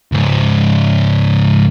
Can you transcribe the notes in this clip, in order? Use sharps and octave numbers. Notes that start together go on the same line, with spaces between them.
C#2 G#2